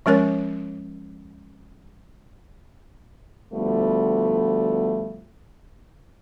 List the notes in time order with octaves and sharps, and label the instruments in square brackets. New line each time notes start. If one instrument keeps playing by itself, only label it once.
[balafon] F3 G#3 C#4 A#4 C#5
[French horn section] D2 F3 G3 A3 B3